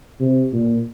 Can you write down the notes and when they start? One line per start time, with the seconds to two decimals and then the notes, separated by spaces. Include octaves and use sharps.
0.20 C3
0.53 A#2